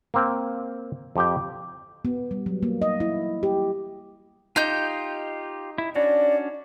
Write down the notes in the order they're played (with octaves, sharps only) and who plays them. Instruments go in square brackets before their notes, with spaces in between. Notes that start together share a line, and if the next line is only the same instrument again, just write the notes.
[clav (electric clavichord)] A#3 C4
F2 G4 G5
[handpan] B3
G3
F#3
A#3
D#5
E4
G4
[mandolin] D#4 G6 [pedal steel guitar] F4 G4
[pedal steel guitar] E4
[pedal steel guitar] C#4 D4 F#4 [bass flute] D5